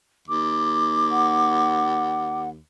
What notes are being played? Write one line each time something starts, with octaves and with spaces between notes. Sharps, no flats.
D#2 D6
F#5